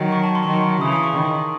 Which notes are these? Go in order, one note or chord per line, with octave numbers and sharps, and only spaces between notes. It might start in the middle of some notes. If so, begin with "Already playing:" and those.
Already playing: D#3 F#3
C#6
A5
C6
D#3 F#3 C#6
C#3 E3 D#6
D#6
C#6
D#3